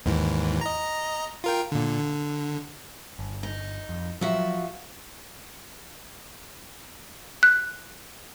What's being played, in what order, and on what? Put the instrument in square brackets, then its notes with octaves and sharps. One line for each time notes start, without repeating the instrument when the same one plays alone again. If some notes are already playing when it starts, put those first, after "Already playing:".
[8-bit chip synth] D#2 G#2 E3
D#5 A#5
F4 A#4 G5
A#2 D3
D3
[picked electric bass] G1
[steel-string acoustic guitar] D#4
[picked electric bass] F2
[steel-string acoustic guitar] F3 F#4 E5 [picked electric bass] F#3
[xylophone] F#6